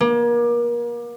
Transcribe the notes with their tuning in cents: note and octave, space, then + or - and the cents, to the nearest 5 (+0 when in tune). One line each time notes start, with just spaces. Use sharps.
A#3 +35